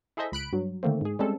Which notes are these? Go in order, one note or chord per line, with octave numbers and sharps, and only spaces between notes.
E4 G#4 A4 C5 D#5 E5
C#2 B5 F#6 D7
G2 F#3
D3 D#3 A3 A#3 C4
G#2 G#4
G3 G#3 C4 C#4 A4